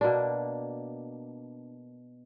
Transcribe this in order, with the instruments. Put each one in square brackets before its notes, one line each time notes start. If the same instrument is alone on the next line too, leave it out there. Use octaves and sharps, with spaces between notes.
[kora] B2 A#3 D4